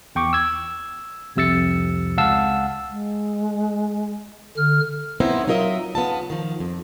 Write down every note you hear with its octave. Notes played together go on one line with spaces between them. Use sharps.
E2 G5 C#6 D6
E6 G#6
C2 F2 C3 E6 A6 C#7
C#2 F5 F#5 A5 E6
G#3
D3 F6
B3 C4 D#4 E4 C5
F#3 D#4 F4 A#4 D#5 E5
C#3 B3 F4 A5
D#3 F3
F2